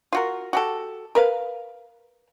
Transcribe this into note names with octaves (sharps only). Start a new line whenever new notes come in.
F4 F#4 A#4
F#4 G4 A4
A#4 B4 F5